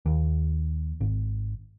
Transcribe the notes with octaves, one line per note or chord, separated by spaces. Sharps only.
D#2
G#1